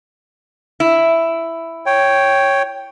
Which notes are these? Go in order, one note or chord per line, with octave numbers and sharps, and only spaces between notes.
E4
C#5 G5